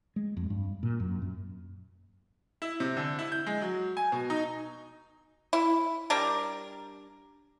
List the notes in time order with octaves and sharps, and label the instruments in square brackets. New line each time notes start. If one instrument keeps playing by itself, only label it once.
[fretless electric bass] G#3
F2
G2
A#2
F#2
F#2
[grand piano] E4
C3
D3
E4
G6
G#3
F#3
G#5
B2
D#4
[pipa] E4
G3 D4 A#4